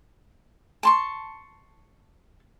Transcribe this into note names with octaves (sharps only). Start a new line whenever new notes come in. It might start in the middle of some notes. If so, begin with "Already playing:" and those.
A5 C6 C#6